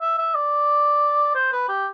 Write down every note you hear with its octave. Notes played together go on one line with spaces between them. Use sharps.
E5
E5
D5
C5
B4
G4